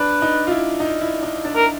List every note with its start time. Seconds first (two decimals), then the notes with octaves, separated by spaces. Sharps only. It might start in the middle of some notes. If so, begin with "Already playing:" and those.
Already playing: D4 B4
0.22 D#4
0.47 F4
0.51 E4
0.80 D#4
1.01 E4
1.23 D#4
1.45 D4
1.56 A#4